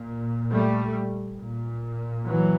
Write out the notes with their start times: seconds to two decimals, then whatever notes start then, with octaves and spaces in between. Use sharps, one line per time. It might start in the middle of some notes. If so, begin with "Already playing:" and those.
Already playing: A#2
0.51 G3 A3
1.39 A#2
2.26 E3 F#3